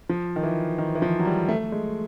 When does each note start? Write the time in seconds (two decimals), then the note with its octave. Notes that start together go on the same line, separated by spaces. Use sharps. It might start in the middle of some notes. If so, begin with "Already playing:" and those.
0.09 F3
0.36 D#3
0.43 E3
0.78 D#3
0.95 E3
1.02 F3
1.19 F#3
1.25 G3
1.49 A3
1.72 G#3